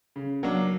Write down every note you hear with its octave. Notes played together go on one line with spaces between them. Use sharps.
C#3
F#3 A#3 D4